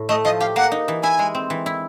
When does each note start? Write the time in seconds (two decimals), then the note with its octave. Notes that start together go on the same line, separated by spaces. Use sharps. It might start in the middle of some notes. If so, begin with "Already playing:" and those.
Already playing: A2
0.09 A3 D#5
0.25 F3 D#5
0.40 G4 F5
0.56 A#3 F#5
0.72 D#4
0.88 E3
1.03 E4 G#5
1.19 G#3
1.35 C4
1.50 E3
1.66 E4